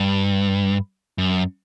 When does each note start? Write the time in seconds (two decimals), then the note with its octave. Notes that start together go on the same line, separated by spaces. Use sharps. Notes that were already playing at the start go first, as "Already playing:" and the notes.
Already playing: G2
1.18 F#2